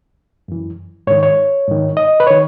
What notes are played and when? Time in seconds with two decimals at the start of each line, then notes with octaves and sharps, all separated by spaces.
0.48 F#2 E3
1.07 G#2 D#3 C#5
1.23 C#5
1.68 G#2 D#3
1.97 D#5
2.20 B4
2.27 D#3 C#5